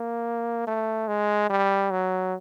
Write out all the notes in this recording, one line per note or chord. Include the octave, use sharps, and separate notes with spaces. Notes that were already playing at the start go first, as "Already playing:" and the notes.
Already playing: A#3
A3
G#3
G3
F#3